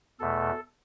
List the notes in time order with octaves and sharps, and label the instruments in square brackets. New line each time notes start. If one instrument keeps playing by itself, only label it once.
[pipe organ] E2 B2 A3 A4